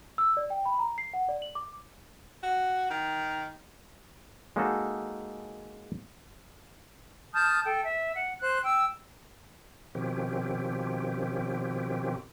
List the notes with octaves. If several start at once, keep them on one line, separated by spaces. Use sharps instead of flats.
E6
D5
G5
B5
A#5
C7
F#5
D5
F#7
D6
F#4
D#3
G#3 A#3 C#4 D#4 F#4 A4
A5 D#6 F6 G6
A4 G5
E5
F#5
C5 F#6
G5 E6
B2 D#3 F3 C4 C#4 G4